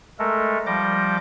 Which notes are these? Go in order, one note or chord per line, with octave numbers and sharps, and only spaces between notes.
G#3 A3 A4 A#4
F3 G3 D6 G6 A#6